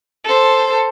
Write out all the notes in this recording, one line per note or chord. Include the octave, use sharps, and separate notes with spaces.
A4 C5